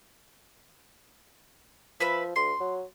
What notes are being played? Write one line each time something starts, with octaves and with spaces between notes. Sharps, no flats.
F3 B4 E5 B5
D2 C6
F#3